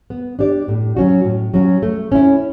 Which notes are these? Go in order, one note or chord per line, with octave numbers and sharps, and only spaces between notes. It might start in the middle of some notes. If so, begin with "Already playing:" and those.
B3
D4 G4 D5
A2
F#3 C#4 F#4
A2
F#3 C#4 F#4
A3
C#4 E4